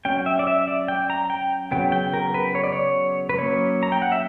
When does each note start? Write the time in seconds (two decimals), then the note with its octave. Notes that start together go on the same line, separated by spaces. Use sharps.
0.05 F#3 C#4 G5
0.26 E5
0.39 D5
0.47 E5
0.68 D5
0.88 G5
1.10 A#5
1.30 G5
1.71 C#3 F#3 B3 G5
1.92 G5
2.14 A#4
2.34 B4
2.55 C#5
2.64 D5
2.72 C#5
3.29 B4
3.38 F#3 A#3 C#4 C#5
3.83 A#5
3.92 G5
4.02 F#5
4.12 E5